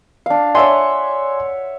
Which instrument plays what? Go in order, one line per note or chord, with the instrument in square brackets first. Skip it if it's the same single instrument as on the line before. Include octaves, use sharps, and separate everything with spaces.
[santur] D4 F5
[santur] C#5 E5 F#5 [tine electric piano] D5 G#5 C6